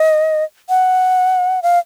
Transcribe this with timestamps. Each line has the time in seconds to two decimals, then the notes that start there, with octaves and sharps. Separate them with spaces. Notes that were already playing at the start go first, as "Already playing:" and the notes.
Already playing: D#5
0.69 F#5
1.62 F5